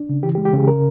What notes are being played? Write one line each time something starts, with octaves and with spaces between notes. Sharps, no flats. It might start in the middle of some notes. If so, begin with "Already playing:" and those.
Already playing: D4
C#3
E3 G4
G4
G#3
G4
C#3 G#4
A#4